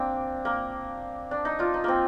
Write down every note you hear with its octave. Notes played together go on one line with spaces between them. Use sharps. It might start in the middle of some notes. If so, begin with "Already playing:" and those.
Already playing: A#3 C4 D4
A#3
D4
D#4
D4 F4
D#4
A#3 C4